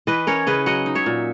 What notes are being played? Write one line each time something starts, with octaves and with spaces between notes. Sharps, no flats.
E3 B4 D#5
C#4 A#4 C#5
C#3 B4 D#5
F#3 D#5 F#5
D#4
C#5 E5
A#2